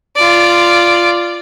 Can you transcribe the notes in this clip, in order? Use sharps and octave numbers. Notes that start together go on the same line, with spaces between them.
F4 D5